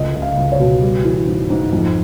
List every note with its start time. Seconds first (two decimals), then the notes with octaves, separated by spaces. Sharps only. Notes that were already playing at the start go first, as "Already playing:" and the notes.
Already playing: C#2 A3 D#5
0.15 C#2
0.22 F5
0.37 C#2
0.52 C#5
0.59 B2
0.81 G3
1.05 E3
1.27 G#2
1.50 G#2
1.73 F2